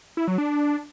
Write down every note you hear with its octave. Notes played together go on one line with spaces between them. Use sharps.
E4
F#3
D4